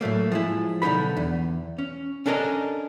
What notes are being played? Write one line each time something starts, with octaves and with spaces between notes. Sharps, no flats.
A2 F#3 A3 A#3
F3 G#3 E4
B1 D3 D#4 A4 B5
E2
C#4
C#4 D4 A4 A#4 C#5 D#5